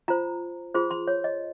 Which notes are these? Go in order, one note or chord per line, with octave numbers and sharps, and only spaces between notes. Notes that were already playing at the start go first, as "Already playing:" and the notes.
F4 C5 A#5
F4 G#4 C5 C6
C6
C#5
D#5